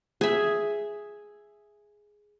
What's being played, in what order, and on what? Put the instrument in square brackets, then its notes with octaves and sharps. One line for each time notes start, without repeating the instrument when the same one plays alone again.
[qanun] G#4 E5